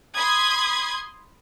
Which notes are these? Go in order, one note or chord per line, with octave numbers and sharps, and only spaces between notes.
B5 C6 D#6 G#6